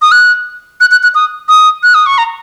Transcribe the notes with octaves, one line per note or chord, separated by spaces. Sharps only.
D#6
F#6
F#6
F#6
F#6
D#6
D#6
F#6
D#6
C#6
A#5